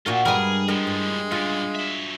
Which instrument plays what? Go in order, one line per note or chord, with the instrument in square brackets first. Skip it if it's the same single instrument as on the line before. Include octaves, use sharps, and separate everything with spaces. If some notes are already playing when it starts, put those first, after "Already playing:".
[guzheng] A#2 F#4 A#4 [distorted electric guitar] F4 E5
[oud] G2 [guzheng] G3 G#3 B4 [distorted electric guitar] G#4 [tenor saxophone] A#4
[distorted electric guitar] A2 F3 [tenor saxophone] G#3 [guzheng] A#4
[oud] G2
[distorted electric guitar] F#2 A#2 [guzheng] F4
[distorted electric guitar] F#3 E5